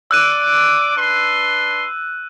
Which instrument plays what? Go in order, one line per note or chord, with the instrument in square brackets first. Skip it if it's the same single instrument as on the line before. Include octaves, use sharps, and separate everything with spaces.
[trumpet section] D5 D6 [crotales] E6 F#6 D#7
[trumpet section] D4 B4 C6